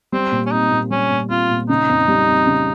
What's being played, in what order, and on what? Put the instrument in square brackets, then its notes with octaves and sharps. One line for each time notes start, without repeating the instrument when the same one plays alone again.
[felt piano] G3 [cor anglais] C4
[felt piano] A#2
[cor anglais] C#4
[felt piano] C4 [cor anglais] D#4
[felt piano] A#2
[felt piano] G3 [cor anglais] C#4
[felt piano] A#2
[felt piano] C4 [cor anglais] F4
[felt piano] A#2
[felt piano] C#3 [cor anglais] D#4
[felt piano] F2
G3
C4
C#3